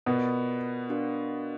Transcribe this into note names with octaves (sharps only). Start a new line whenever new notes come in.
B2 B3 F4 A#4 D5
D4 F#4 A#4 D5 F5